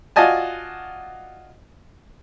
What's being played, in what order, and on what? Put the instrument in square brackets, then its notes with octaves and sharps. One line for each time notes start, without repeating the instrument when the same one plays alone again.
[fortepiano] F4 F#4 D5 D#5 G#5 A5